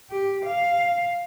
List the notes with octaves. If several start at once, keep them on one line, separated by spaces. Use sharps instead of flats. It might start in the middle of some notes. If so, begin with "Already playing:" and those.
G4
F5